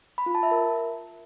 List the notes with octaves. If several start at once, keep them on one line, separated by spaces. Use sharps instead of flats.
B5
F4
A5
E5
A#4